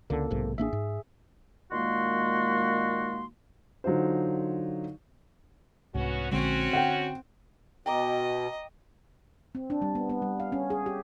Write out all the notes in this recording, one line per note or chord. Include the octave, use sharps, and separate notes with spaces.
C#2 D3 A#3 A4
B1 G#2 C3
A1 A#3 D4 G#4 E5
G#2
A#2 D#3 G#3 A#3 F#4 C6
D3 F#3 D#4 F4 C5
C2 G#2 B3 C#4 F#4
A#1 D3 G#3 C4 C#4 F#4
D3 F#5 G5
B2 D#5 G5 A#5 D6
C4
D4
G3
B3
B3
G3
F5
C#4
G#4
G4